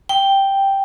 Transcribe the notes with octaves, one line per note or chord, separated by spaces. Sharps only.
G5